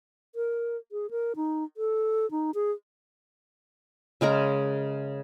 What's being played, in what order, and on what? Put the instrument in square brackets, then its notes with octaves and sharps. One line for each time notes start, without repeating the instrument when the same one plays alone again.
[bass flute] A#4
G#4
A#4
D#4
A4
D#4
G#4
[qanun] C#3 G#3 A#4 A#5